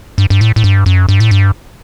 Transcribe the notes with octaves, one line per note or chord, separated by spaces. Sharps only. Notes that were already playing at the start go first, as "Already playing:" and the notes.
G2
G2
A2
A2
G2
F#2
G2
A2
G2